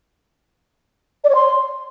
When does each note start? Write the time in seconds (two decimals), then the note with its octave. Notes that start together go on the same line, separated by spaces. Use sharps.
1.24 D5
1.30 C#5
1.35 C6